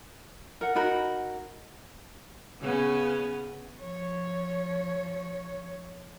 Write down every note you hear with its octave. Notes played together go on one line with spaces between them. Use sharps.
A#4 F#5
D#4 F#4 A#4 B5
C#3 B3 C#4
F3 C#5